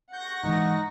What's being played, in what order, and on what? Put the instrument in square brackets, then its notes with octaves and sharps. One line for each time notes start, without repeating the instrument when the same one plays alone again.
[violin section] F#5 C#6 A#6 [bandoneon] G6
[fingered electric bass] G#2 E3 G#3 [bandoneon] D#4